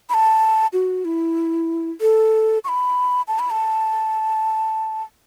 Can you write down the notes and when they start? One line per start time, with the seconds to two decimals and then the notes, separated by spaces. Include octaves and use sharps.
0.09 B5
0.14 A5
0.73 F#4
1.05 E4
2.01 A4
2.64 C#6
2.68 B5
3.28 A5
3.39 B5
3.50 A5